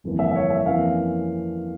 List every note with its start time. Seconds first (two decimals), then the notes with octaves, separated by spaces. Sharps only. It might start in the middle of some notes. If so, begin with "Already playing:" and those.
0.04 G1 F2 E3 A#3
0.19 E5
0.31 E5
0.35 C#5
0.50 E5
0.66 F2 E3 A#3 C#4 F5